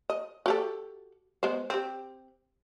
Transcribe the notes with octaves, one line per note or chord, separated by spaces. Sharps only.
D#5
F#4 G4 A4
G#3 B3 C5
C4 G4